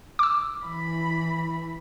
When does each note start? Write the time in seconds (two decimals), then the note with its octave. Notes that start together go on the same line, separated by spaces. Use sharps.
0.19 D6 E6
0.64 E3 B5